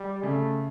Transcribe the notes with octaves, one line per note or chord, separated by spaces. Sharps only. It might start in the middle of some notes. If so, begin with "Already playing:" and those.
Already playing: G3
C#3 A3